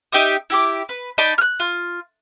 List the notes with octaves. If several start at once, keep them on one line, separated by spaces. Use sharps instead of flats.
D#4 G4 E5 D#6
E4 G4 D6
B4
D#4 D5 A5 B5
F6 F#6
F4